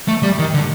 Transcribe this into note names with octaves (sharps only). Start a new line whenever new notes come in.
A3
G3
D#3
D3